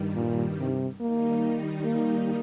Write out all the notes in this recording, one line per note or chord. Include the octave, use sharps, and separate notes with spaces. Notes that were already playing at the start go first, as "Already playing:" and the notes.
Already playing: G2 D#3 G3
A#2
C3
D#3 G3 A#3 D#4
A#3